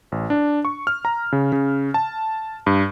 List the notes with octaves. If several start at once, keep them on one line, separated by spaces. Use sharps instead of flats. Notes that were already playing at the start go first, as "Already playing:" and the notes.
A1
D4
C#6
F6
A#5
C#3
C#3
A5
G2